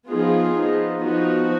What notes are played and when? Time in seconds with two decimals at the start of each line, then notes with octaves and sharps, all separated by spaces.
0.10 F3 B3 D#4 F4 G#4
0.56 F3 B3 D#4
1.03 F3 B3 D#4 F#4